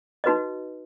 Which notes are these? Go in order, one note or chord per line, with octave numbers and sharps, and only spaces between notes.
D#4 F#4 B4 D#5